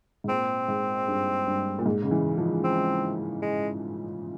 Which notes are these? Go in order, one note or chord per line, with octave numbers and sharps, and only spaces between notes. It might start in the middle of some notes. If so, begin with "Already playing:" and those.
G#2
A#2 C4
G#2
G2
G2
A#2
G#2
C#3
E3
F3
C4
G#3